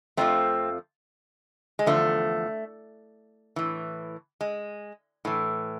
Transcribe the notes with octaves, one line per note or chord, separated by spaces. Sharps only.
F2 D3 F3 A3 C4
G#3
E2 D3 F3 A3
A2 E3
G#3
A2 E3